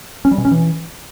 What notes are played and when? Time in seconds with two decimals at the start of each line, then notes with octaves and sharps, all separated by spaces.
0.25 C#4
0.31 G3
0.38 B2
0.45 C#4
0.51 E3